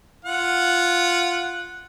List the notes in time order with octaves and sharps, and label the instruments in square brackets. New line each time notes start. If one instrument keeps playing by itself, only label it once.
[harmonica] F4 F#5